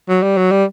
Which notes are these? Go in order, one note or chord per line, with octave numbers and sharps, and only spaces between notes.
F#3
G3
F#3
G3